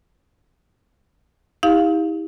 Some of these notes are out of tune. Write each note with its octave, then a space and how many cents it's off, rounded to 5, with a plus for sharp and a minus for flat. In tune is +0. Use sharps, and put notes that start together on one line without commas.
E4 -45 G4 +30 F5 +0